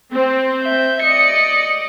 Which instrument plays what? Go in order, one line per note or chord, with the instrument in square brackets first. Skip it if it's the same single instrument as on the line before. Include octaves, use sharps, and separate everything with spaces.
[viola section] C4
[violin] E5 G6
[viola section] D5 D#5 [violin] C#7